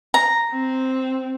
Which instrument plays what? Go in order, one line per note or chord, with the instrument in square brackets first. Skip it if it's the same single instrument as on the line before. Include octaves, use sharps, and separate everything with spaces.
[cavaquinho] A#5
[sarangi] C4